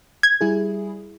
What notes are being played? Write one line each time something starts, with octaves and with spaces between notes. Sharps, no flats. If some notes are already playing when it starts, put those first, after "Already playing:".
G#6
G3 E4 G#4